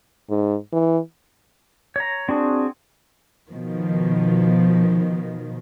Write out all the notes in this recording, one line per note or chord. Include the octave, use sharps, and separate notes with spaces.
G#2
E3
C#5 A#5
C4 D4 F#4 G#4
B2 D#3 F3